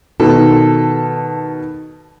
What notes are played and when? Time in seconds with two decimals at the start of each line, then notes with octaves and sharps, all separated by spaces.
0.20 B2 D#3 A4